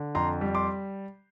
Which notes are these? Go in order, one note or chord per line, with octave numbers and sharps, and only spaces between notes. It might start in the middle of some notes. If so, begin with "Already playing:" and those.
Already playing: D3
F2 A#5 C6
G3
C6 D6